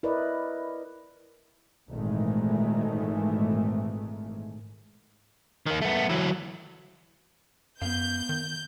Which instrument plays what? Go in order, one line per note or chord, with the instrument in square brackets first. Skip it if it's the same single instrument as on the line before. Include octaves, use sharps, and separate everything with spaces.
[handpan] E4 A#4 B4 D5 D#5
[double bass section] G#1 A#2 D#3 E3 G#3 A3
[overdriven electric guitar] D#3 A#3
A3 B3
E3 F#3
[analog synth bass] F#2 [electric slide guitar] B3 F5 [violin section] G6
[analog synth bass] D#3